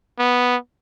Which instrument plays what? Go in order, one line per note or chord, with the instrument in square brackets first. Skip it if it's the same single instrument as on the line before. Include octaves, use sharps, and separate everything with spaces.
[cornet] B3